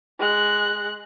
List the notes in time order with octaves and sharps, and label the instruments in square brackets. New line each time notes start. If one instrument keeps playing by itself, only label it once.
[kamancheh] G#3 F#6